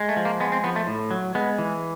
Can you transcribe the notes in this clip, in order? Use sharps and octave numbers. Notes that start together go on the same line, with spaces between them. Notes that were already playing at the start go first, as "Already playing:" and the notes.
Already playing: G#3
A3
F3
A#3
G#3 B3
C4
F3 B3
A3
A2
F#3
G#3 B3
E3